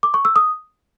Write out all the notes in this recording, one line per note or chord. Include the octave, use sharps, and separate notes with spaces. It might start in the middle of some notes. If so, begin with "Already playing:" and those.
D6
C#6
E6
D#6